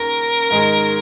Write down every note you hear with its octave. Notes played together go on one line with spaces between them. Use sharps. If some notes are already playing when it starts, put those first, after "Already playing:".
Already playing: D#2 C#3 D#4 A#4
G#2 D#3 G#3 D#4 G#4